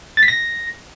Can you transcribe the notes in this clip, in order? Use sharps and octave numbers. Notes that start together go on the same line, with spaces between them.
A6
B6
A#6